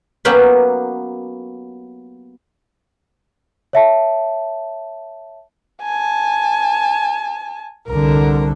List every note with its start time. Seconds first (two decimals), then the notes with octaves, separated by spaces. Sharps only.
0.25 F#3 A#3 B3 C#4 G4 B4
3.73 C#5 E5 A5
5.82 G#5 A5
7.88 C2 D3 A#4